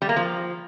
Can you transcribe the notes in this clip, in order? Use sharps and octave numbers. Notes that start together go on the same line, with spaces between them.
G3
A#3
F3